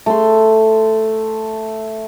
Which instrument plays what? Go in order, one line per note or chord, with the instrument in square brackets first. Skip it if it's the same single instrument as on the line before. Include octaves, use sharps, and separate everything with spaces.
[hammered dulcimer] A3 C6